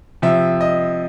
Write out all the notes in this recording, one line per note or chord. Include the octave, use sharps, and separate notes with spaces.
C3 F3 E5
D#5